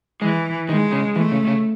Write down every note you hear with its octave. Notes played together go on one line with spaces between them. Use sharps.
E3 G#3
D#3 G#3
C#3
E3 A3
C#3
C#3